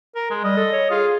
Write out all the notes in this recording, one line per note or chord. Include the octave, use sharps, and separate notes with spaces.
A#4
G#3
G3 D#5
A4
C#5
F4 G#4